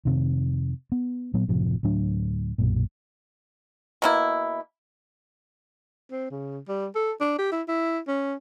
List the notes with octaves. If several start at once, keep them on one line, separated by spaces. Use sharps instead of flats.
F2 C3 D#3
B3
A#2 F#3 B3
F#1 A2 C3 F3
D2 A2 F#3 D4
B1 F#2 A#2
B2 A#3 E4
C4
C#3
G3
A4
D4
G4
E4
E4
C#4